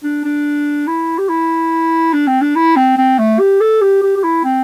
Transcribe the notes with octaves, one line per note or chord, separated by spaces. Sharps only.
D4
D4
E4
G4
E4
D4
C4
D4
E4
C4
C4
A3
G4
A4
G4
G4
G4
E4
C4